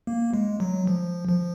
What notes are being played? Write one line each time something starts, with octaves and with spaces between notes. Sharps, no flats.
A#3
G#3
F#3
F3
F3